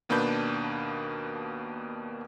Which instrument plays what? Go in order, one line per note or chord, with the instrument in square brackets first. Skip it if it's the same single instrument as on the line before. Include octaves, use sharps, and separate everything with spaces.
[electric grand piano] D#2 B2 A#3 D4 B4 G6